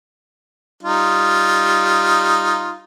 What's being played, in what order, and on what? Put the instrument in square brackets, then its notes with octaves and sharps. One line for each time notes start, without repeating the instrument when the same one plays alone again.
[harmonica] G3 D#4 F4